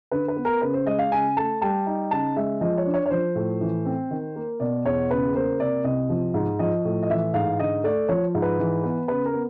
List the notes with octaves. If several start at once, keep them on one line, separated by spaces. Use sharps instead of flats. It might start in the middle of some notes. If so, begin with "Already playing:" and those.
D3 B4
B4
B3
A#4
C#3 B4
C5
G#3 D#5
F5
C#3 G#5
A3 A5
G3 A5
D#4
C#3 A5
G#3 E5
F3 D#5
C#5
D4
C#5
C#5
F3 C5
A2
E3
C4
D#3
A#3
B2 D5
E2 C#5
C#3 B4
A#3 C5
C3 D5
C2 D#5
F3
G#2
F3 D#5
A2
D#5
E3 E5
G#2 F5
D3 D#5
A3 D5
F3 C#5
G#2
B4
E3
B3
C#3 B4
A#4
B3